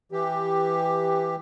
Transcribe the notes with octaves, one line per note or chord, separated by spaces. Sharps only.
E3 G4